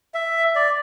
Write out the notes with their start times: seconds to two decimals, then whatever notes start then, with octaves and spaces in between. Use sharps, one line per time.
0.14 E5
0.55 D5